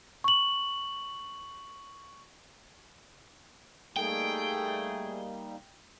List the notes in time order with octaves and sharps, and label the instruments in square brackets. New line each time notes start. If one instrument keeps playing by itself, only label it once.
[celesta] C#6 F#7
[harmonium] G3 A#3 D#4 [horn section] A3 G#4 [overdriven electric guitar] G5